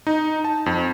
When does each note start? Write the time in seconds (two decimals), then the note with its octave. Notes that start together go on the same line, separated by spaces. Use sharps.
0.07 D#4
0.44 A5
0.66 F2